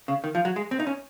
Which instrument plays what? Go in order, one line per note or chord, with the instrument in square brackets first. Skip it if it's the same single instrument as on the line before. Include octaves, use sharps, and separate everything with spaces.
[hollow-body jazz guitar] C#3
D#3
F3
F#3
G#3
C4
D#4
C#4